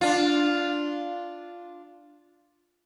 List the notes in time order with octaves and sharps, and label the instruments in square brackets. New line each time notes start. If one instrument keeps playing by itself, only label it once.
[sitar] D4 F4